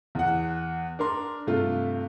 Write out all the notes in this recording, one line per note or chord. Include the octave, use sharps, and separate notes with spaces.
E2 F#5
D4 A#4 C6
G2 C3 A3 F4